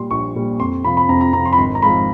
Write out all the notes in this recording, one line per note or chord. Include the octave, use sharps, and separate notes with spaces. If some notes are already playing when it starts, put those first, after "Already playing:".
Already playing: A#2 G3 C6
A#1 C#6
A#2 G3
F2 C6
C3 F3 B5
B5
F2 A#5
A#5
C3 F3 A#5
C6
B5
G#1 C6
A#5
G#2 F3 G#3 B5